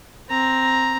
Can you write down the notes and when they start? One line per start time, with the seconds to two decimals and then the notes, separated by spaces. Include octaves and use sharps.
0.29 C4 A#5